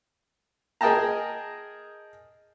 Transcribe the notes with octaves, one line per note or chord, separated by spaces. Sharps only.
G#4 A#4 D#5 G5 A5 A#5